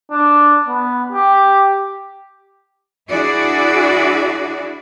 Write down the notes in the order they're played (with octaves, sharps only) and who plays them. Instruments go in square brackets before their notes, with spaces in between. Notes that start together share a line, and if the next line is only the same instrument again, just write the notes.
[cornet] D4
B3
G4
[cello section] D4 E4 F#4 G#4 D5